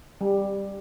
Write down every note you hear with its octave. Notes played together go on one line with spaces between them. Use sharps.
G3